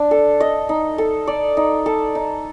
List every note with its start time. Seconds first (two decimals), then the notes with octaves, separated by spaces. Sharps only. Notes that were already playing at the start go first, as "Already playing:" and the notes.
Already playing: D4
0.11 A4
0.40 D#5
0.69 D#4
0.98 A4
1.27 D5
1.57 D#4
1.86 A4
2.15 D#4